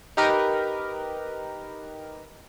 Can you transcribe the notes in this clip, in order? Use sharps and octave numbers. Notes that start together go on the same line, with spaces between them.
D#4 G4 A#4 B4